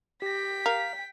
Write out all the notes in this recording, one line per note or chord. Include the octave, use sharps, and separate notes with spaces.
G4 G5 A#6 B6
A#4 F5